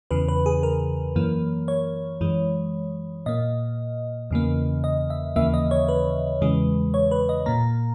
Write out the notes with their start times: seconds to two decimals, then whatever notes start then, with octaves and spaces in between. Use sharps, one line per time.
0.11 E2 C#3 E3 B4
0.28 B4
0.46 G#4
0.63 A#4
1.16 F#2 E3 A#3
1.68 C#5
2.21 F#2 E3 G#3
3.26 A#2 A#3 D#5
4.31 E2 C#3 E3 A#3
4.84 D#5
5.10 E5
5.36 D#2 C#3 E3 A#3 E5
5.54 D#5
5.71 C#5
5.88 B4
6.41 E2 C#3 E3 G#3
6.94 C#5
7.11 B4
7.29 D#5
7.46 A#2 A#3 A#5